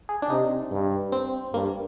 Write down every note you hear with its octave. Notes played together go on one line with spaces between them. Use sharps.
G#4
D4
C3 D#4
G2
C4
G2 A#3